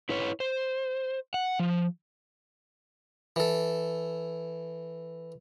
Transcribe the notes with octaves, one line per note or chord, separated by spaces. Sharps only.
E4 B4 C#5
C5
F#5
F3
E3 A4